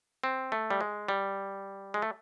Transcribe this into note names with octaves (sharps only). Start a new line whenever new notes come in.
C4
A3
G3
G#3
G3
G#3
A3